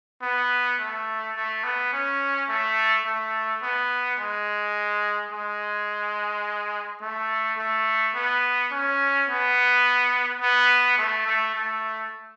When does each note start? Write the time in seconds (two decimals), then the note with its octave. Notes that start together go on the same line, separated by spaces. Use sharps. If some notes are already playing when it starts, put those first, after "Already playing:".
0.22 B3
0.80 A3
1.36 A3
1.64 B3
1.93 C#4
2.49 A3
3.06 A3
3.63 B3
4.20 G#3
5.33 G#3
7.02 A3
7.59 A3
8.16 B3
8.72 C#4
9.29 B3
10.42 B3
10.98 A3
11.27 A3
11.55 A3